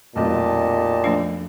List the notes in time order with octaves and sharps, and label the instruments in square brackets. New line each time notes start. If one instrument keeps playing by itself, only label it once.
[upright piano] F1 B1 [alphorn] A#2 [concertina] G4 D#5 A5
[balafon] F3 A3 D4